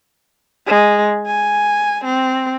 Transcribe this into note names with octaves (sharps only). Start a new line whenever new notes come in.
G#3
G#5
C4